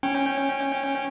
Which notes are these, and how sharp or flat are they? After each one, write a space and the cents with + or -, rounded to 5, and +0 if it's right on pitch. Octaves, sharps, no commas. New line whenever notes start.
C#4 -15 G5 +0